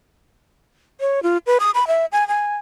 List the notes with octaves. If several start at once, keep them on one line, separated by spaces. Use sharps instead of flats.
C#5
F4
B4
D#6
B5
E5
G#5
G#5